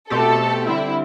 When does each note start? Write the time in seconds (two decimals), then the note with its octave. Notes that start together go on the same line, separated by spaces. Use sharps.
0.10 B2 A3 C4 G4 A4
0.67 D3 G3 C4 E4